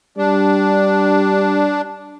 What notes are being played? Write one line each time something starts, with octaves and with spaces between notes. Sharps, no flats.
G3 D4